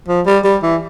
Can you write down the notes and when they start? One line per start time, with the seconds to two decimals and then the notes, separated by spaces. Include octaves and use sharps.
0.08 F3
0.26 G3
0.44 G3
0.63 E3